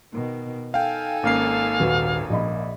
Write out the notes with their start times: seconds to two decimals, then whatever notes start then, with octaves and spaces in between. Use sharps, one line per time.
0.13 B2 D#3
0.74 D#4 A4 F5 G5 G#5
1.23 G#1 A#3 C#4 F5 C7
1.80 D#1 F#4 B4
2.30 A#1 D#5 B5